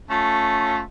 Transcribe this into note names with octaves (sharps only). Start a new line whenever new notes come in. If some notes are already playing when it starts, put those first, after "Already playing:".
A3 C#4 F4